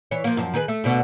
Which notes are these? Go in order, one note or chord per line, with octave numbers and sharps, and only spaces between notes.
E3 C#5
F3 A#3
F#2 F3
D#3 G#4 B4
A3
D2 B2 D3